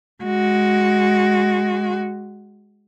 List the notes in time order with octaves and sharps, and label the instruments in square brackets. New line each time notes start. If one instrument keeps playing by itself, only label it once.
[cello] G#3 F#4